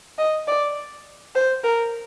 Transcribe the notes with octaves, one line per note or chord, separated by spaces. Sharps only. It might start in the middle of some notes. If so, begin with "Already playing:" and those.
D#5
D5
C5
A#4